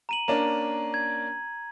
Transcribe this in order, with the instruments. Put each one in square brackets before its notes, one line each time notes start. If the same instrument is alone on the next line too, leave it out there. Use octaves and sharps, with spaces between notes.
[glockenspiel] A#5 D#7 F#7
[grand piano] A#3 C#4 D4 [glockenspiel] A#5
[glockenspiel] G#6